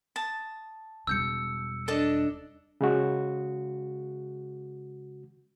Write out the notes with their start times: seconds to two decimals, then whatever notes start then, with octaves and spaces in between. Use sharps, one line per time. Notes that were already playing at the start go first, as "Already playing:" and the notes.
0.16 A5 D#6
1.07 E1 G3 E6 G6 C#7
1.88 D4 A4 D#5
2.81 C#3 G#3 F#4